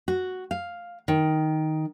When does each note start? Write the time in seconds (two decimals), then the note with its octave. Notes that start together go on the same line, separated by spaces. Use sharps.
0.08 F#4
0.51 F5
1.08 D#3